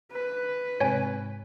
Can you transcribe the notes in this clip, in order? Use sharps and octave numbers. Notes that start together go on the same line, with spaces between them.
B4
G#2 C3 C#5 G#5